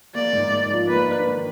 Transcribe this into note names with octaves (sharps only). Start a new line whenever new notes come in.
A#3 D5
G#2
G#2
F3
A#3 B4
D4
D#3